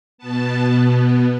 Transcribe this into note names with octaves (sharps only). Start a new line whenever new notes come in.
B2 B3 A5